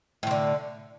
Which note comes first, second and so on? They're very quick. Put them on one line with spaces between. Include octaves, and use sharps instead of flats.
A2 F3 D3